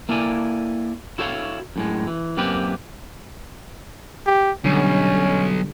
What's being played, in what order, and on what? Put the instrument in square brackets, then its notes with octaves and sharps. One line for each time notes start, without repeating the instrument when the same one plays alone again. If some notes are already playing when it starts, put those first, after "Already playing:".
[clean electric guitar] A#3 E4 A4 D5 G#5
E4 F#4 A4 C#5 E5 F5
F#2 A2 G#3
E3
F#2 A#3 C4 G4 B4
[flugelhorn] G4
[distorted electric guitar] B1 [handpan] D3 G3 [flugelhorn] C#4